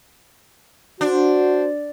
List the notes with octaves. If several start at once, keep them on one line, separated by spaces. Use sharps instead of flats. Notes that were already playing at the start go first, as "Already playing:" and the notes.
D4 F#4 C5